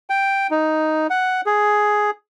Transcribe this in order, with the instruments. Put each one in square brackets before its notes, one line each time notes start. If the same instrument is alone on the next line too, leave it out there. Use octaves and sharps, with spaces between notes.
[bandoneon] G5
D#4
F#5
G#4